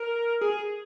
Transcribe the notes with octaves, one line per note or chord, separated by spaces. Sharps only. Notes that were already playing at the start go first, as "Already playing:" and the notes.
Already playing: A#4
G#4